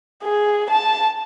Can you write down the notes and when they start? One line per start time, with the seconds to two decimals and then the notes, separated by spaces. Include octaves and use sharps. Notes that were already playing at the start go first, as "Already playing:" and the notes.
0.24 G#4
0.70 A5